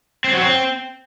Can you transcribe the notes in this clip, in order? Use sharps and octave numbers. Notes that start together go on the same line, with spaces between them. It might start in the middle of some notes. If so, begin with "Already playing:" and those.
C4
F#3
C4